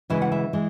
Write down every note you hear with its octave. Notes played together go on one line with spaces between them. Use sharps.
C#3 E3 G#3 E5
F#5
E5
E3 G#3